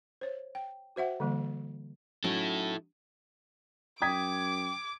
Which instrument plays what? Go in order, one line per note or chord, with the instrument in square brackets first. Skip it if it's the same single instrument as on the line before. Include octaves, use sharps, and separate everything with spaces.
[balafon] C5 C#5
G5
F#4 C5 E5 F#5 G5
D3 E3 G3 A#3
[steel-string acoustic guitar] F#3 C#4 D#4 [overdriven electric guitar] E4 A4
[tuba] F#2 [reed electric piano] G5 [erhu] D6 [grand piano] D#6 G#6 B6